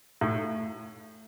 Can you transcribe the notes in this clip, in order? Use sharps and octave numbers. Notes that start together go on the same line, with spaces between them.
A2